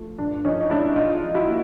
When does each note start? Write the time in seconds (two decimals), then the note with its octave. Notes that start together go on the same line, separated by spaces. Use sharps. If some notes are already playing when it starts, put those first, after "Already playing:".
Already playing: F3 A3
0.18 G2 D4
0.45 F3 C#4 D#4
0.61 D#4
0.70 G#3 D4 E4
0.96 B1 D#4 F4
1.22 F3
1.34 E4 F#4
1.47 A#3